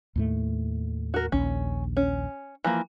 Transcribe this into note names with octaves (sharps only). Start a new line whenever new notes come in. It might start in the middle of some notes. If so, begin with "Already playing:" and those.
D#2 A2 A3
F#4 A#4
A#1 D#2 C#4
C#4
E3 F3 A#3